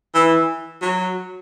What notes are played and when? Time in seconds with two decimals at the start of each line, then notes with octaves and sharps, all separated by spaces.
0.14 E3
0.82 F#3